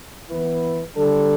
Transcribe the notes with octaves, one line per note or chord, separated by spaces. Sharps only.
E3 B3 E4 B4
D3 G3 D4 A4